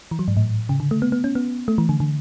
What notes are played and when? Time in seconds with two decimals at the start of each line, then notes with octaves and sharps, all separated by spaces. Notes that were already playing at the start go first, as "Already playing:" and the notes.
0.11 E3
0.19 F#3
0.28 G#2
0.37 A2
0.69 C#3
0.80 D3
0.91 A3
1.02 B3
1.12 B3
1.24 C#4
1.35 B3
1.68 A3
1.78 E3
1.89 D3
2.00 D3